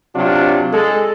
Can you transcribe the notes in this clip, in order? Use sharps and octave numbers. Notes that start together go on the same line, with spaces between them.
C3 F#3 D4 F4
G#3 A4